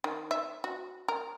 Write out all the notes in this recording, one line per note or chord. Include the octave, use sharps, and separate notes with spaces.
D#3
E5
F#4
A#4